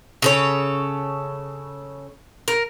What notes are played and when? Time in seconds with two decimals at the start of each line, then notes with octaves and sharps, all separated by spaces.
0.22 C#3 A4 C#5
2.48 A#4